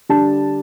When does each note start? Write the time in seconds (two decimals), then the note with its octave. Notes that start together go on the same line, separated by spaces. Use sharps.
0.09 D3 G3 D4 A5